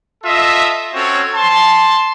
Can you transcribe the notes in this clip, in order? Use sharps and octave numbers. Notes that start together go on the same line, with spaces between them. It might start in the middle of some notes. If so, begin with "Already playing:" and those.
F4 A4 D#5 E5
C4 C#4 F#4 A4 C#5
A5 C6